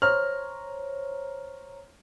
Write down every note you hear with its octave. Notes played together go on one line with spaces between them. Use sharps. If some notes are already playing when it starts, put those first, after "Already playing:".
C5 C#5 A#5 F6